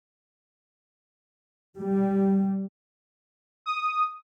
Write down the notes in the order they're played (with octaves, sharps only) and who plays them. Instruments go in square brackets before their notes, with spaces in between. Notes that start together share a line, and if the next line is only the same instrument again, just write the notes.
[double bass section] G3
[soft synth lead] D#6